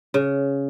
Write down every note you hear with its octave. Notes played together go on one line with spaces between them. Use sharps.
C#3